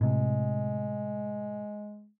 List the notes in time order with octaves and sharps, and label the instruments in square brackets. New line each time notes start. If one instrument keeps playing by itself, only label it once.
[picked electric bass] A2 C3 [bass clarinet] G#3